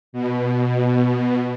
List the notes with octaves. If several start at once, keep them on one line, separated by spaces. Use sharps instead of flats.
B2